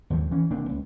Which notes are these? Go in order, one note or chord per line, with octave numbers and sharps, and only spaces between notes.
G#1 D#2 F3 F#3
E3 C#4
F1 A#3 C4 D4
C#2